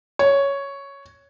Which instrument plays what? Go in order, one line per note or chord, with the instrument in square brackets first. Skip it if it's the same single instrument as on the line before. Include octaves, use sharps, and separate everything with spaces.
[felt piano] C#5